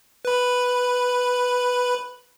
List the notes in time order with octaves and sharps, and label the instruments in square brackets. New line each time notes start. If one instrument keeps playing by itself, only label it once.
[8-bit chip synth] B4 B5